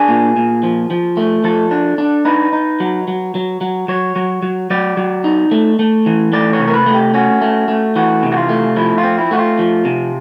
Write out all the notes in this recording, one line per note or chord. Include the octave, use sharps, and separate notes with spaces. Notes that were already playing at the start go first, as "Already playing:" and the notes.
Already playing: D4 G#4
A#2
A#2
F3
F3
A3
F3 A4
D4
D4
D#4 B4
D#4
F#3
F#3
F#3
F#3
F#3 C#5
F#3
F#3
F#3 D5
F#3
D#4
A3
A3
E3
A3 D5
C#5
C3
A#4
B4
A3
G4
C#4 F#4
A3
A3
E3 F#4
C3
F#4
F4
A3
F3 E4
F4
C4
E4
A3 F#4
F4
F3
C3